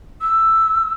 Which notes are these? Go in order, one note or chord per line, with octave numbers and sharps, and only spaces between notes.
E6